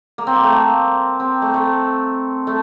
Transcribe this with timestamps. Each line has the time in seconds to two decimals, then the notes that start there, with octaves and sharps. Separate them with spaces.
0.18 A#3
0.27 C4
0.36 A#3
0.44 A3
0.52 A#3
1.20 C4
1.42 A3
1.54 A3
2.47 A3